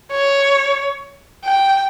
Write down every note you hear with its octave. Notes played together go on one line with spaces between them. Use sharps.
C#5
G5